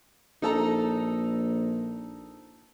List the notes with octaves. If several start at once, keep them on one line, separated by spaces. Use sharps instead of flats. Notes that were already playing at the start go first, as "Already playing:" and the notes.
A#1 D#4 A4 A#5